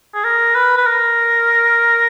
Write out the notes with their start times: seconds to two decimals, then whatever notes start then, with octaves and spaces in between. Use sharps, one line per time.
0.14 G#4
0.24 A#4
0.55 B4
0.77 B4
0.86 A#4